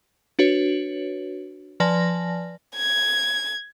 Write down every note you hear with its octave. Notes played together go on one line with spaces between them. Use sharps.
D4 F#4 B4 C#5
F3 B4 D5 G#5 A5 A#6
G#6